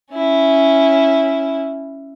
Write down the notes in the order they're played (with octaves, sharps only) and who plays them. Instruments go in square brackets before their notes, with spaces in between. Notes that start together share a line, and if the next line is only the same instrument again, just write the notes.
[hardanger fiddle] C#4 E4